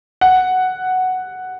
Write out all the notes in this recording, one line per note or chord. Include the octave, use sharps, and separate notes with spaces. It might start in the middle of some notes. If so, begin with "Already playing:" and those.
F#5